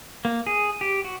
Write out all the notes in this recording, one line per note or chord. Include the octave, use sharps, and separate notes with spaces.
A#3
G#4
G4
F#4